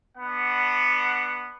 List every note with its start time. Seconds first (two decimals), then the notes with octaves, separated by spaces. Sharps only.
0.17 B3 D4 F#5 B5